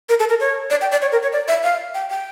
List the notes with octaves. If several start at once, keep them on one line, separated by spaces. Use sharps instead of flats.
A#4
A4
A#4
C#5
D5
G5
D5
C#5
A#4
C#5
D5
E5
F5
G5
G5